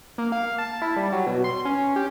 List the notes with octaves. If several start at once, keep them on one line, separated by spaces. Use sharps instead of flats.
A#3
F5
A5
E4
G3
F#3
B2
C6
C#4
G4